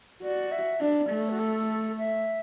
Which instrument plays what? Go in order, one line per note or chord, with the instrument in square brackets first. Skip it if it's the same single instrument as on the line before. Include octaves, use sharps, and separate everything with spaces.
[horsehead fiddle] F#4 [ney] D5
[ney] E5
[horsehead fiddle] D4 [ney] D5
[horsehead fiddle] A3
[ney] F#4
A4
E5